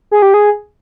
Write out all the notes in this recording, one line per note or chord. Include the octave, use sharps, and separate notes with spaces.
G#4
G4
G#4